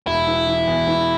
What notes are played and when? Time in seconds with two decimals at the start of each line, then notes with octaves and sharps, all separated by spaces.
0.06 E1 E4
0.27 E3
0.47 E3
0.67 E2
0.87 E3